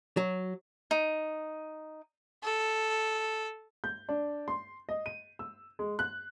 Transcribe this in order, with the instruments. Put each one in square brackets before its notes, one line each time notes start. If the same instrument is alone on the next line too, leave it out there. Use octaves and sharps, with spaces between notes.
[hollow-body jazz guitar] F#3
[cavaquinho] D#4
[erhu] A4
[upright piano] G6
D4
C6
D#5
D#7
E6
G#3
F#6